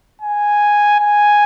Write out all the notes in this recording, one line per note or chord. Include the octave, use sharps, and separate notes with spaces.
G#5
G#5